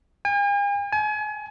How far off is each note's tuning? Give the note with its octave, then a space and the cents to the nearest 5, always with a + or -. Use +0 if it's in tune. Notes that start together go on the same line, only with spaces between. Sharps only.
G#5 -45
G#5 +35